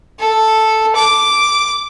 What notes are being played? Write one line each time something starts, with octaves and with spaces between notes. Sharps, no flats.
A4
D6